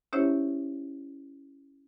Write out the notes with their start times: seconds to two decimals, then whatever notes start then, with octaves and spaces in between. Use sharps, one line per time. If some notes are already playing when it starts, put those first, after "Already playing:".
0.13 C#4 E4 G4 C5 C#5 E5